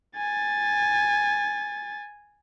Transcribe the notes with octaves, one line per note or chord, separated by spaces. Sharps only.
G#5 A6